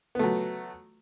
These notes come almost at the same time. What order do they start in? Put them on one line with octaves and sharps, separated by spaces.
B3 A3 F#3